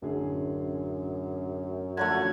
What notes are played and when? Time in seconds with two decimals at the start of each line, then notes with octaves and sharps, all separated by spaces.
0.02 A1 F#2 D3 G#4
1.97 D3 F3 F#3 A3 C#4 G#6